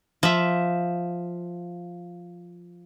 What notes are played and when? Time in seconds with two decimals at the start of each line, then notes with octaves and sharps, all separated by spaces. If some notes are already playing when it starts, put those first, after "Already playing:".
0.23 F3 E5